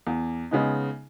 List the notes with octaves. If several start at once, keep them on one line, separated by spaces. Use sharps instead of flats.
E2
C#3 G#3 B3 D#4